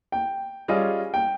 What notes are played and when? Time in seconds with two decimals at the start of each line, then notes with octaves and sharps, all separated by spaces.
0.12 G5
0.68 G3 C#4 F4 G#4 D#5
1.14 G5